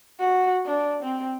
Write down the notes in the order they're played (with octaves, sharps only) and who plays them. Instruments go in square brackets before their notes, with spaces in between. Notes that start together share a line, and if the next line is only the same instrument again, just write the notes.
[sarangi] F#4
D4
C4